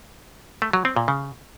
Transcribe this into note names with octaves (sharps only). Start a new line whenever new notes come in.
A3
F#3
C4
A#2
C#3